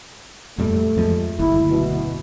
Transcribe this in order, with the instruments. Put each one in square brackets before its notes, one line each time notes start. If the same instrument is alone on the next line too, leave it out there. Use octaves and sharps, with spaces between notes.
[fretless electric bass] F2 A#2 G3 [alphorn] A3
[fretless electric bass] F2 F3 G#3
[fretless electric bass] F#1 D2 [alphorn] E4
[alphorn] B2